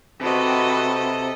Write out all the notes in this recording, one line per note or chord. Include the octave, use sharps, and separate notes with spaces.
C3 F#4 A4 B4 D#5